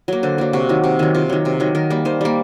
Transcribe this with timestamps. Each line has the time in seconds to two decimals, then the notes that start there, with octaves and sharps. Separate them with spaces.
0.08 F#3 A#3
0.23 D3 C5
0.38 F#3 A#3
0.53 C3 F#4
0.69 D#3 F#3
0.84 C3
0.99 D#3 F#3
1.15 C3 F4
1.29 D#3 F#3
1.45 C3
1.60 D#3 F#3
1.75 D#3 A#4
1.90 G3 A#3
2.05 D#3 C5
2.21 G3 A#3